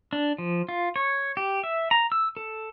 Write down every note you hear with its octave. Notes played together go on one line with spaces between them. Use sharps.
D4
F3
F4
C#5
G4
E5
A#5
E6
A4